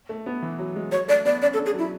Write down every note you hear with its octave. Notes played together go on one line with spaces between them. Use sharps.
A3
B3
E3
F#3
G#3
F#3 C#5
A3 D5
B3 D5
C#4 D5
A4
D4
G#4
F#3
E4